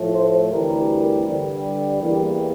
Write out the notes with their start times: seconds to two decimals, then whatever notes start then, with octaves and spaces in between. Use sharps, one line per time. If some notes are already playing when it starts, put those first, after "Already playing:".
Already playing: A2 F3 A3
0.14 C5
0.51 D2 C3 E3 G3 A#4
1.26 G2 D3 G3
2.01 E2 E3 G3 A#3 G4